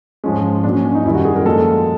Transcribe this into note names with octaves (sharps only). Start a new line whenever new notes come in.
G#2 F3 G#3 C#4
A#2 F#3 D4
C#4
C#4
D#4
F#2 D#3 G3 E4
F#4
G#4
A#4
A#2 F3 G#3 A4